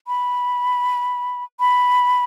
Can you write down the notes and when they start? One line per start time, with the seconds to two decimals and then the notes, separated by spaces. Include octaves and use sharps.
0.08 B5
1.60 B5